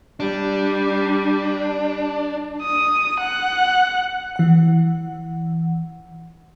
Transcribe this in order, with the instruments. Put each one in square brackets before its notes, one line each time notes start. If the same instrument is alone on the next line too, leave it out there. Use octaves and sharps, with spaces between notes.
[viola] G3 [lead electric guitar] D4
[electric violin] D#6
F#5
[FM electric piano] E3 F#5